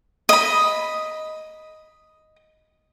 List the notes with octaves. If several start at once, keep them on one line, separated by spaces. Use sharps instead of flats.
D#5 B5